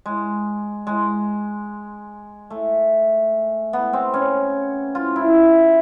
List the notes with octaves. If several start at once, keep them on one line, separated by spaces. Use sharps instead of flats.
G#3
G#3
A3
B3
C4
C#4
F4
E4